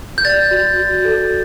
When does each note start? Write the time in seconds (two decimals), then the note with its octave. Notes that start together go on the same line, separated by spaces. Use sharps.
0.18 G6
0.25 D5 A6
0.51 F#4
0.78 F#4
1.05 A4